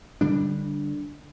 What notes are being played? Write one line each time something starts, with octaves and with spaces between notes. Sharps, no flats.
D3 G3 D4